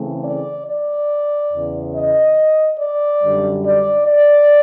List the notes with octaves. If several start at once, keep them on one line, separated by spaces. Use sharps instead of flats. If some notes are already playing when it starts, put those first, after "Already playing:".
Already playing: C#3 E3 A3 C4
D5
D5
E2 C#3 E3
D#5
D5
F#2 D3 G3
D5
D5